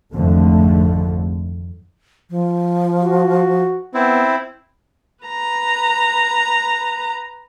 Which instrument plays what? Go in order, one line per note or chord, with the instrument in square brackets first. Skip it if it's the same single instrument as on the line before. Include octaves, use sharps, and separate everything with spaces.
[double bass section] G#1 F2 D3 A3
[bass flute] F3
[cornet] F#4
[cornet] B3 [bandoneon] C4 E4
[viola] B4 A#5